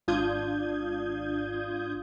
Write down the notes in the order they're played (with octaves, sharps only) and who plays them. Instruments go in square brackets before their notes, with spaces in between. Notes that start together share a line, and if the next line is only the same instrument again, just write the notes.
[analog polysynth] G#1 D4 F4 D#6 G6 G#6